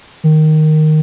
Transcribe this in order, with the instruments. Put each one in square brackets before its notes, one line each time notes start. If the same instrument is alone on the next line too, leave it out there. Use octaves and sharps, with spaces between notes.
[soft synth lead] D#3